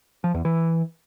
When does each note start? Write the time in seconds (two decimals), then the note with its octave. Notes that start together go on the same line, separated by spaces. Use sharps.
0.24 F3
0.34 E2
0.45 E3